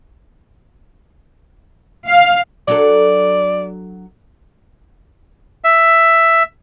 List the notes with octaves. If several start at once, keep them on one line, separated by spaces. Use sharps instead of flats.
F5
F#3 D4 A4 D5
E5